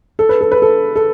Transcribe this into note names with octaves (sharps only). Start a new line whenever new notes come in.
A4
B4
A4
B4
A4
A4